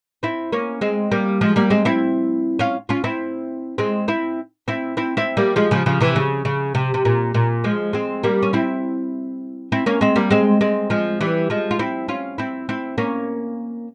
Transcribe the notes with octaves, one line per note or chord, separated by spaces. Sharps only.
C4 E4
A#3 C#4
G#3 C4
G3 A#3
F3 G#3
G3 A#3
G#3 C4
C4 E4
C#4 F4
C#4 F4
C4 E4
G#3 C4
C4 E4
C4 E4
C4 E4
C4 E4
G3 A#3
F3 G#3
C#3 F3
C#3 F3
C3 E3
C#3
C#3
C3
C3
A#2
A#2
F3 G#3
G#3 C4
G3 A#3
C#4
C4 E4
C4 E4
A#3 C#4
G#3 C4
G3 A#3
G#3 C4
G#3 C4
F3 G#3
E3 G3
F3 G#3
F4
C4 E4
C#4 F4
C4 E4
C4 E4
A#3 C#4